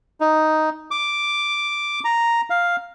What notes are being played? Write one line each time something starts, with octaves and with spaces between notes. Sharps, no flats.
D#4
D6
A#5
F5